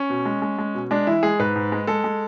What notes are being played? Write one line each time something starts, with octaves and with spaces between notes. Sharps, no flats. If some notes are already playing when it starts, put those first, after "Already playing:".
Already playing: C#4
B2
G#3
G#3
G#3
B2
G#3 D4
E3 E4
G#3 G#4
G#2 B4
G#2
G#3
G#3 A4
G#3